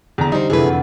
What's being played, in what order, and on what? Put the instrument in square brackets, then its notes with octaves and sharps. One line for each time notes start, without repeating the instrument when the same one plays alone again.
[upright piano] E2 A#5 [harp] D3
[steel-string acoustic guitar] G3 C5 [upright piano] D#4
[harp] F1 F#3 [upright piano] E3 A3 [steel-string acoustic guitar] G#4 B4
[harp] F2